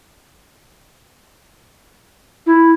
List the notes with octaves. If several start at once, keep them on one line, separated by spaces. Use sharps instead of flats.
E4